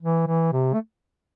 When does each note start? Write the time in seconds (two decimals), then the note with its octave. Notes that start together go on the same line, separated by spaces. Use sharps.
0.01 E3
0.27 E3
0.52 C3
0.73 A3